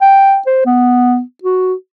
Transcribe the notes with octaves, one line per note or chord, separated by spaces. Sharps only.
G5
C5
B3
F#4